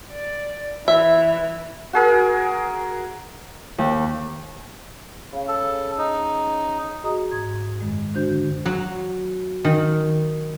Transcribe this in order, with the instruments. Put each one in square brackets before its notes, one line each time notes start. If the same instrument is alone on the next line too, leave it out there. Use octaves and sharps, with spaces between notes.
[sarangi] D5
[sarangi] E3 [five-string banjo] E5
[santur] F#4 G#4 A#4
[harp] D#2
[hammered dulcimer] C#3
[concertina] A4
D#4
[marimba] F#4 G#4 D#5 A#5 D#6
G#2 G#6
F#2 D#3 G#3
D3 D4 F#4 C5 G6
[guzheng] F#3
D#3